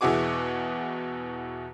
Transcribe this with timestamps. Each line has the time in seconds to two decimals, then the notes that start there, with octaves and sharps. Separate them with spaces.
0.01 E2 B2 E4 F#4 G#4 D6